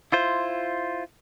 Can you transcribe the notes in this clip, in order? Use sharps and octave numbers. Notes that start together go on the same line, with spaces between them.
E4 F4 C5